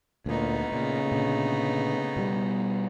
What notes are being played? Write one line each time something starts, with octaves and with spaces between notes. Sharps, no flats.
D2 A#2 A3 B3 D#4
A#2 C#3
A#2 D3
B2 G3